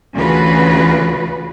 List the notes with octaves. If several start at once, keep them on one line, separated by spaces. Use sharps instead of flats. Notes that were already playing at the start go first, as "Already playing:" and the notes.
D2 C#3 E3 F4 F#4 B4